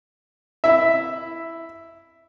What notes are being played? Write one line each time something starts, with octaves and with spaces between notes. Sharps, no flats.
E4 E5